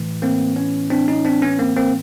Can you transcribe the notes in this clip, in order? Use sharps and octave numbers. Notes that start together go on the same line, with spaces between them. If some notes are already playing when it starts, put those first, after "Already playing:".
Already playing: A2 E3
A#3 C4
B3 C#4
C4 D4
C#4 D#4
C4 D4
B3 C#4
A#3 C4
A#3 C4